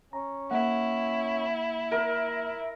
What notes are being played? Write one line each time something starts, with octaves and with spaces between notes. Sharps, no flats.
C#4 A#5
A#3 E4 F#5
A#4 E5